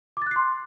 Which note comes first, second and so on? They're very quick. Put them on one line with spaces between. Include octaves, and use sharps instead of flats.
D6 A6 F#6 C7 C6